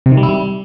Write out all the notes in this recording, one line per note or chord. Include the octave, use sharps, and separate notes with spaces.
C3
D#3
G3
E4
G3